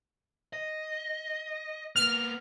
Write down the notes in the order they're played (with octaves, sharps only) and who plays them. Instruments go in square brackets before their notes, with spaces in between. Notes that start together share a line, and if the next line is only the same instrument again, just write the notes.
[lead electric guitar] D#5
[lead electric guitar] A#3 B3 [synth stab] F6